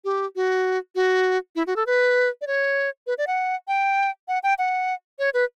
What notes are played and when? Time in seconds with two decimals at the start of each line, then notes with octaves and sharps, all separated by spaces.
0.05 G4
0.36 F#4
0.95 F#4
1.56 E4
1.67 F#4
1.76 A4
1.87 B4
2.41 D5
2.47 C#5
3.07 B4
3.18 D5
3.27 F#5
3.68 G5
4.28 F#5
4.43 G5
4.59 F#5
5.19 C#5
5.34 B4